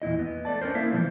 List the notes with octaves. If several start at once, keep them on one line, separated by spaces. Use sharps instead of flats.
E2 A#2 E4 D#5
B3
A3 D5 A5
C#4 D4 A#4 C5
A#3 E4 E5 F5
C3 E3 F3 A#3 D#4 C5